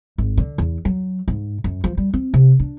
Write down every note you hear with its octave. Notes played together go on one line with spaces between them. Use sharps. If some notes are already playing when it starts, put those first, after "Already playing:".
G#1
D3
E2
F#3
G#2
F#2
F3
G3
C4
C3
D4